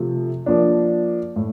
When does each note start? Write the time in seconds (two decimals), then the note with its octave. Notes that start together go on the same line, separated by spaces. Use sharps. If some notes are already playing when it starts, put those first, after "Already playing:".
Already playing: C3 F3 A3
0.46 F3 A#3 D4
1.36 A2